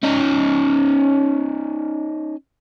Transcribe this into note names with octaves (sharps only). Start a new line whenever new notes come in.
C#4 D#4